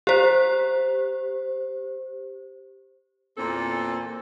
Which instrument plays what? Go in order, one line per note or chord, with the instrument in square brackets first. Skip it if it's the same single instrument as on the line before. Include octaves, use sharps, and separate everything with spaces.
[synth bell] G4 C5
[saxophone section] E2 A#2 C4 A4